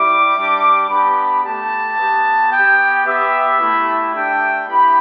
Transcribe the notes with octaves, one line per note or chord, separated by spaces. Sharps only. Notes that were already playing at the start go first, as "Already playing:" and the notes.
Already playing: G3 E4 G4 D6
G3 D4 G4
B3 D4 G4 B5
A3 G4 A5
B3 G4
B3 G4 G5
B3 G4 E5
A3 E4 G4
A3 D4 G4 G5
B3 E4 G4 B5